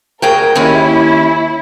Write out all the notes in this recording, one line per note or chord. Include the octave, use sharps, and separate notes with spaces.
D2 G#4 A#4 G5
D#2 C#4 E4